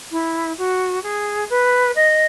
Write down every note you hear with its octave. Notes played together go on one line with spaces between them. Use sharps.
E4
F#4
G#4
B4
D#5